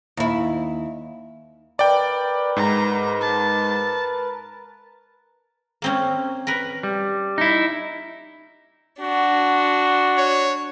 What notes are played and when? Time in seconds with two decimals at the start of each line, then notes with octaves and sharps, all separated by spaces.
0.17 D#2 E4
1.79 A#4 B4 D5 G5
2.57 G#2 A#5
3.21 A5
5.82 A#3 C4 C#4
6.47 A#4 B4
6.83 G3
7.38 D#4 E4
9.00 D4 F#4
10.17 C#5